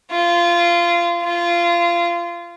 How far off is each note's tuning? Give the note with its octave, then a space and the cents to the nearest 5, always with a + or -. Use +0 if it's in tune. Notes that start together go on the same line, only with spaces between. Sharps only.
F4 -20
F4 -20